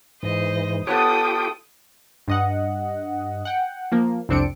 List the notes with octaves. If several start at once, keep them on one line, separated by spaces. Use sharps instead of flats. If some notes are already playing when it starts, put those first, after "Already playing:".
G#2 E3 C5 D#5
B3 F4 G4 A4 B4 C#5 G5 D#6
G2 D#5 F#5
F#5 G5
F3 A#3
C2 F2 C4 D4 C#7 D7